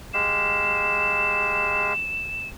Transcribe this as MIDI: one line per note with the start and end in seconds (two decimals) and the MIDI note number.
0.13 1.93 56
0.13 1.93 67
0.13 1.93 77
0.13 2.49 100